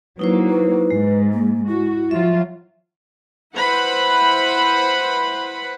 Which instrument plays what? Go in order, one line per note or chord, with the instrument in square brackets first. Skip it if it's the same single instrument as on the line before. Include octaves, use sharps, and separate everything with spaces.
[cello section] F#3 A#3 [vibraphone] D#4 E4 C5 [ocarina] B4
[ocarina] B4
[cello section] G#2 [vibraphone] G#3
[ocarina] A#3
[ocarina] E4 [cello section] F#4
[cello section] F3 F#3 F4 [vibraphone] E5
[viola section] E4 B4 C5 F#5 B5